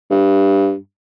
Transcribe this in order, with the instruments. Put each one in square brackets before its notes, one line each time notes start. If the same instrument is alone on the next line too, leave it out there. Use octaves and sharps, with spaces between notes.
[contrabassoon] G2